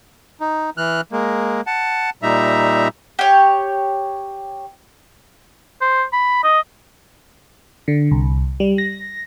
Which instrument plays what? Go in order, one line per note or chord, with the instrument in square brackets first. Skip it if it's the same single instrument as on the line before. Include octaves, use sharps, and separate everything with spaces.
[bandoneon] D#4
E3 F6 F#6
G#3 A#3
F#5 A5
A#2 G3 D#4 E5 A#5
[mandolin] G4 C#5
[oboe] C5
B5
D#5
[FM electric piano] D3
C2
G3
A#6